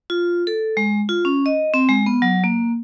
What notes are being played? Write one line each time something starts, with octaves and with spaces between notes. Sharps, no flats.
F4
A4
G#3
F4
C#4
D#5
C4
G#3
B3
F#3
A#3